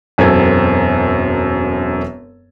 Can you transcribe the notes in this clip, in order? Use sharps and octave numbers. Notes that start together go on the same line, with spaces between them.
E1 F#2 C4 A4 G#6